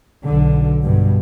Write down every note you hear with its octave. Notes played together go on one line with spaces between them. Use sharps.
B1 D3
G2 B2